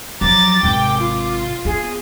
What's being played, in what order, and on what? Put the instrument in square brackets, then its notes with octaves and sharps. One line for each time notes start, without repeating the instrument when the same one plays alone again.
[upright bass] F3 F#3 [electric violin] A#5 A6 [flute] D6
[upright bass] G#1 C3 [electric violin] G5
[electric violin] F4
[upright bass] B3 [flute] G#4